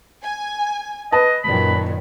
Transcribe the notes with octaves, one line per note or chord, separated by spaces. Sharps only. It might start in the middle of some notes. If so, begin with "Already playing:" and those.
G#5
B4 D#5 A5
F#2 A#2 D#3 B5